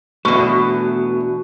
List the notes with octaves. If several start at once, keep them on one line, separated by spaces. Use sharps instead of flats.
E2 B2 A3 B3 D4 F#4 E5 C#6